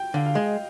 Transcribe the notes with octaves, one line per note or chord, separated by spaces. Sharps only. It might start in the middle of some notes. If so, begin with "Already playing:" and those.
Already playing: G5
D3 F5
F5
G#3 D#5